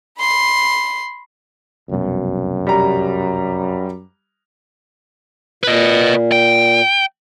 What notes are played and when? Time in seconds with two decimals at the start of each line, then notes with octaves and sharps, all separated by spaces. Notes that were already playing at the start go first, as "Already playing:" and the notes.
0.19 B5 C6
1.89 F1 C2 F#2 B2
2.67 G3 A#5
5.64 A#2 B4 D#5
6.32 G5